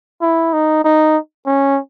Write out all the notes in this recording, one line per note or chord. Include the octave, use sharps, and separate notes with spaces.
E4
D#4
D#4
C#4